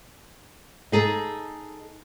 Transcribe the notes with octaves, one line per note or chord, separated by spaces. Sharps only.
D#4 G#4 A4